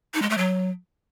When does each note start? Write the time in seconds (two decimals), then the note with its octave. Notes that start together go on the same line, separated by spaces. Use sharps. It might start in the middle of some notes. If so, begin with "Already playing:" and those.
0.14 D#4
0.22 G#3
0.30 A3
0.37 F#3